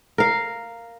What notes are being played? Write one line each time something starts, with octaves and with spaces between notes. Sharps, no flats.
A#4 F5